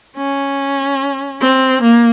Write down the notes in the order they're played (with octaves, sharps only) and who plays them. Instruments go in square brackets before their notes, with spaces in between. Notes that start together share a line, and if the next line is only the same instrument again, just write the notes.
[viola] C#4
C4
A#3